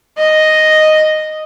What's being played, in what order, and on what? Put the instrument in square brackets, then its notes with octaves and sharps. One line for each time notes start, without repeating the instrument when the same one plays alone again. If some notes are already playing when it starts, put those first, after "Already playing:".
[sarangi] D#5